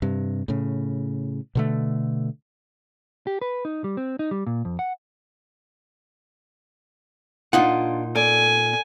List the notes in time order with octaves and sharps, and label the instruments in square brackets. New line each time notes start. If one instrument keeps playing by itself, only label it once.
[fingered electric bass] G2 C3
A2 C#3
B2 D3 A3
[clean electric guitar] G4
B4
D#4
G3
C4
D#4
G3
A#2
F2
F#5
[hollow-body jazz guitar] A#2 D#4 F#5 [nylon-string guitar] D4 F4
[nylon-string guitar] A4 D5 [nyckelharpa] G#5